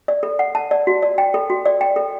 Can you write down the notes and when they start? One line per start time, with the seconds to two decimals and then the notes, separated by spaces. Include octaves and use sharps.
0.08 D5
0.23 A4
0.39 F#5
0.55 A5
0.71 D5
0.87 F#4
1.02 D5
1.18 G5
1.34 A4
1.50 F#4
1.65 D5
1.81 G5
1.96 A4